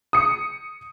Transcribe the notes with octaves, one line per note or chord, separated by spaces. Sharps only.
D#6 C#7